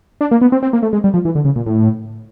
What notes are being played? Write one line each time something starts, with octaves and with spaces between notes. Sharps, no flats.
D4
A#3
B3
C4
C4
A#3
A3
G#3
G3
F3
E3
D3
C#3
A#2
A2